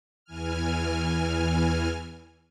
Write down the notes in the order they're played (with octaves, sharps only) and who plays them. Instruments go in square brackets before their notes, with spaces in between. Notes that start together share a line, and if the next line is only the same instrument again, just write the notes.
[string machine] E2 E3 G#5 F6